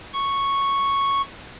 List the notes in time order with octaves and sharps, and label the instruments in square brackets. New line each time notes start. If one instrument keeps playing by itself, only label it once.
[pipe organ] C#6